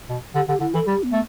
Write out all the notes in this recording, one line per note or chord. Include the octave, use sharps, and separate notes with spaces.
B2
D3 G4
D3 G4
D3 E4
E3 A4
G3 G4
B3
A3